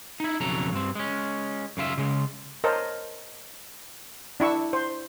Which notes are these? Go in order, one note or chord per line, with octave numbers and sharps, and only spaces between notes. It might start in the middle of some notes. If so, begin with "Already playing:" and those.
D#4 E4
B1 F2 C#3 F#3 A4 A#5
G2 C4
G#3 C#4
F#2 C#3 F4 E5
C#3 G#3
A#4 C5 C#5 D#5 A5
D4 E4 C#6 E6
C5